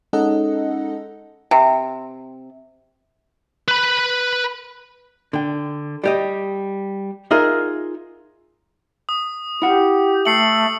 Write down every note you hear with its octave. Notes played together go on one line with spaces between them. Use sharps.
G#3 C#4 D#4 A4 D#5 F#5
C3
B4 B5
D3 G5
G3 G4 D#5
D#4 F4 G#4 A#4 D#5 E5
D#6
E4 G4 F#5
A3 C7 C#7 F#7